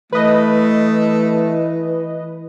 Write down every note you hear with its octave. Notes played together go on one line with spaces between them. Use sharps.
E3 A3 B4 D#5